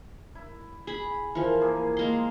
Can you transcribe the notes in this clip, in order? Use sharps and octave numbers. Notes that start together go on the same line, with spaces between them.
E4
G#4 B5
E3 F3 A#4
A#3 E4 G#4
D#3 G#3 A#3 C6